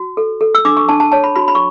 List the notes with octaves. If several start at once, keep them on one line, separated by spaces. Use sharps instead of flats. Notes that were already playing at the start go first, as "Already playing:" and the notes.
Already playing: F#4
A4
A4
E6
D4 D6
C#6
D4 A5
A5
C#5 A5
B5
F#4 B5
B5
C#6